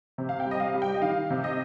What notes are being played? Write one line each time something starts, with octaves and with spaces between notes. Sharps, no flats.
C3
F5
G5
G3
D#5
F5
G3
G5
D#5
D#3 F5
C3
D#5